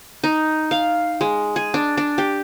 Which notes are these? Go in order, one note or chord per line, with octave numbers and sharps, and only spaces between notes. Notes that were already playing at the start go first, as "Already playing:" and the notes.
D#4
F5
G#3
G#4
D4
D4
G4